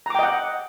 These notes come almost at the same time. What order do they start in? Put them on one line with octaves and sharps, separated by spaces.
A#5 D6 G5 D#5 F#5